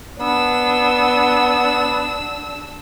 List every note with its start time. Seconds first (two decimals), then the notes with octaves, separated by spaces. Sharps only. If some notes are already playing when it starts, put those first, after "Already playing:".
0.20 B3 D4 E6